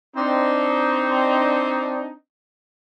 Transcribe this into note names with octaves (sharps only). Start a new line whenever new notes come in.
C4 D4 D#4